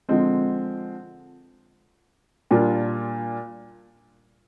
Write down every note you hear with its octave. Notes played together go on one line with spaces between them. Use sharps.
D3 F3 G#3 C4
A#2 G3 D4 F4